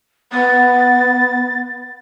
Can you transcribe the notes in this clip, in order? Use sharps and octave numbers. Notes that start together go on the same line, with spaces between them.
B3 A6